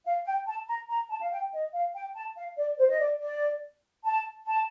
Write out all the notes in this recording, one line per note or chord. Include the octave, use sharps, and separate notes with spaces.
F5
G5
A5
A#5
A#5
A5
F5
G5
D#5
F5
G5
A5
F5
D5
C5
D#5
D5
D5
A5
A5